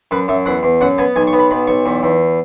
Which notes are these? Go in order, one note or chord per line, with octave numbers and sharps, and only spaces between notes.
F#2 B4
F#2 E5
E2 F#5
E2
F#2 F#5
B3 G#5
B1 G#5
C#6
B3
B5
B1 B5
B1 C#6
E2
E2